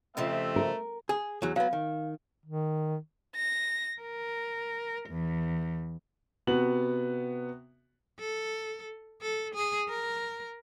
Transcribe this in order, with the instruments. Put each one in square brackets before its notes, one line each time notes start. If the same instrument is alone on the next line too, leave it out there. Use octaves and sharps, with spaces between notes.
[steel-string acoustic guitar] F2 C#3 F3 [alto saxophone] A3 [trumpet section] C4 G4 E5
[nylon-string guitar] A#4
[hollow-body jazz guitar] G#4
E2 F#3
[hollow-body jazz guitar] F#3 B3 [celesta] F5
[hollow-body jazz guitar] D#3
[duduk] D#3
[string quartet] A#6
A#4
E2
[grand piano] C3 B3 F#4 F#7
[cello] A4
A4
G#4
A#4